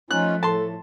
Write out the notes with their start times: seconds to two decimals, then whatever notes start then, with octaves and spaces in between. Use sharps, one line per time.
0.11 F3 A3 C#4 D#4 F4 F#6
0.43 A2 A4 A5 C6